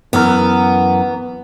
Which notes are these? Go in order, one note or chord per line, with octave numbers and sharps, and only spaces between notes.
F#2 E3 B3 A#4